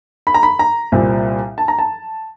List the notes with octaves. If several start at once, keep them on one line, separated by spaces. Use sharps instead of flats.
B5
A#5
B5
A#5
C2 A#2 G3 C4
A5
A#5
A5